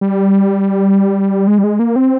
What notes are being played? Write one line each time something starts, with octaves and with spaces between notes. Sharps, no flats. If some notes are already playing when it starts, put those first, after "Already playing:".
G3
G#3
G3
G#3
A#3
C4